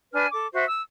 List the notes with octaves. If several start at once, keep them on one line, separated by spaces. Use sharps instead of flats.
D4 B4 G#5 F6
A4 D6
F#4 C5 E5
E6